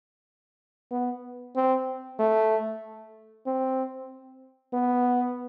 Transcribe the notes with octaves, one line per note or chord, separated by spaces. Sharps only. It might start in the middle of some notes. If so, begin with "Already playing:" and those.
B3
C4
A3
C4
B3